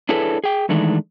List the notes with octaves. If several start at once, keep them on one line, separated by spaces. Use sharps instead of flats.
D4 E4 G#4 A4 B4 C#5
G#4 G5
D#3 E3 G#3 A3 D4 D#4